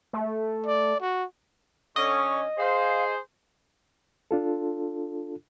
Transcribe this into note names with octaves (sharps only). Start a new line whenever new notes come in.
A3
D5
F#4
D3 C#4 D#5 C#6
G#4 C5 F5
D4 F4 A4